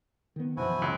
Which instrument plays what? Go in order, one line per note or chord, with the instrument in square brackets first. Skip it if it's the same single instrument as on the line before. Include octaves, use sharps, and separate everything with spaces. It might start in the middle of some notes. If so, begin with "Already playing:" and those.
[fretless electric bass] D#3 B3
[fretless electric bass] F#2 B2 E3 [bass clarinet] F3 [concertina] E4 F#4 G#5
[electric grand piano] C#2